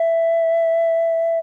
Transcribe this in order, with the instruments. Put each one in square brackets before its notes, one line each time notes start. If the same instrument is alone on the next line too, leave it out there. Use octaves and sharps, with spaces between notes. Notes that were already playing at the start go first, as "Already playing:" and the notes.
Already playing: [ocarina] E5